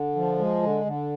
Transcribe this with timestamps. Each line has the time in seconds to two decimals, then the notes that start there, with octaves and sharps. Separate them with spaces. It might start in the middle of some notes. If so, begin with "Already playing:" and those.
Already playing: D3
0.15 F3
0.39 G#3
0.63 D3
0.85 D3